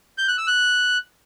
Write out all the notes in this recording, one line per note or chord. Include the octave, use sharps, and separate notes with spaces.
G6
F#6
E6
F#6